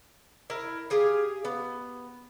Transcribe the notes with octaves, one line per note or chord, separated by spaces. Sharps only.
E4 A#4
G4 G#4 F5
B3